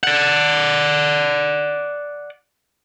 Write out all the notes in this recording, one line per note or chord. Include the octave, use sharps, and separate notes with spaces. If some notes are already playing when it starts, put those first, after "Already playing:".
D5 F#5